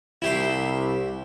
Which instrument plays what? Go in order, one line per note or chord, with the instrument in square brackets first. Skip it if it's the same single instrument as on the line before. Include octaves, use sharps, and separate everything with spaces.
[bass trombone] C2 [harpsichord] E4 G4 C6